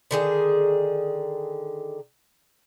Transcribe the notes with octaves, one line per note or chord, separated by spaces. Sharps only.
D3 D#3 G#4